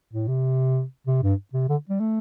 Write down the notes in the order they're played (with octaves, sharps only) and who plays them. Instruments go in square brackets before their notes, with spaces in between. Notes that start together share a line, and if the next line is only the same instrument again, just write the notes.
[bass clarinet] A2
C3
C3
G2
C3
D3
G3
A3